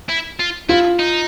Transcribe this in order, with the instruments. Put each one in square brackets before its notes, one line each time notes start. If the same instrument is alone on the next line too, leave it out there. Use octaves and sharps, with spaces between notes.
[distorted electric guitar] E4
F4
[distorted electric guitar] E4 [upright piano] F4
[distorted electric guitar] D#4